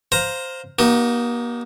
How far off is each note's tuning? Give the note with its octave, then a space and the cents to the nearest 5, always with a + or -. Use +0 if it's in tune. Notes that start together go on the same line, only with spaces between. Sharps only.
C5 +0 F5 +15 A#5 +0
A#3 +40 D#4 +0 G4 -40